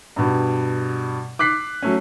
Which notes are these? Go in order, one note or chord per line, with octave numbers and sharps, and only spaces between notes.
G2 B2
D6 F#6 B6 C7
F#3 A3 C#4